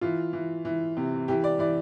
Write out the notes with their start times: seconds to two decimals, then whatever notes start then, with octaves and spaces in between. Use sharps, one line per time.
0.01 E3 F4
0.33 E3
0.65 E3
0.97 C3
1.28 E3 G4
1.44 D5
1.59 E3 D5